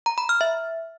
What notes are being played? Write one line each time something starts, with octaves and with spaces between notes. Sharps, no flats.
A#5
B5
F6
E5